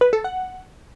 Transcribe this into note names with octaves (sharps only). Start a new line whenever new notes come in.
B4
A4
F#5